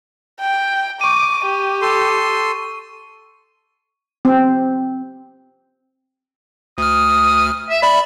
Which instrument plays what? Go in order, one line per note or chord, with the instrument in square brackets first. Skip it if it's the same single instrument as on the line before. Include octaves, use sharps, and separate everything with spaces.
[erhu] G5
[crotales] C#6 D#7 [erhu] D6
[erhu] G4
[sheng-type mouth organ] A4 C6
[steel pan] C4
[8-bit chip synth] D2 F6 [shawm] D#6
[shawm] E5
[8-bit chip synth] D5 E5 [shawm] B5